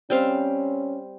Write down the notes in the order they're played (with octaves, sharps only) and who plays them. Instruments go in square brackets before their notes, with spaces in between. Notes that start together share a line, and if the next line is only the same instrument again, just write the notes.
[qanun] G3 C4 F5 [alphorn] C#4